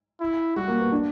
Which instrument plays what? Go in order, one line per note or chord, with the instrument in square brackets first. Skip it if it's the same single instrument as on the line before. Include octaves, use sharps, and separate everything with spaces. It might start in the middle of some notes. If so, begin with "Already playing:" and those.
[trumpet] E4
[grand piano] G3 [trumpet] F#4
[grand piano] A#3
B3
D4